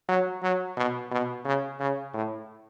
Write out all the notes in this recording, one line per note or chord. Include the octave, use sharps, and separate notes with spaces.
F#3
F#3
B2
B2
C#3
C#3
A2